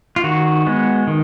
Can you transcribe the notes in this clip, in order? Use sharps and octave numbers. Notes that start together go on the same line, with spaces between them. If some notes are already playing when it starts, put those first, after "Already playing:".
F4
D#3 F#4
G#3 B3
D#3